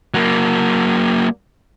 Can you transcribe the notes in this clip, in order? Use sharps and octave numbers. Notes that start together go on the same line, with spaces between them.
F#3 A#3